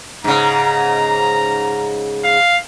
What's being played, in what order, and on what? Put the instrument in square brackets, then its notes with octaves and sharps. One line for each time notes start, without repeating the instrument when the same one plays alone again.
[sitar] G#2 C#3 [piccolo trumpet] A#5
[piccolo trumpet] F5